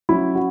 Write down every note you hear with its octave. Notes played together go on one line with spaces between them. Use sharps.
F#3 C#4 E4
F#4